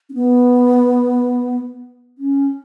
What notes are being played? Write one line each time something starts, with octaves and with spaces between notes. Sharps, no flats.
C#4
B3
C#4